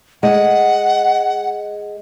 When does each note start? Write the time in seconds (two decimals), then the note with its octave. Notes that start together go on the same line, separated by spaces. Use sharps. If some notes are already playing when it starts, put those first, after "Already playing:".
0.23 G#3 F#5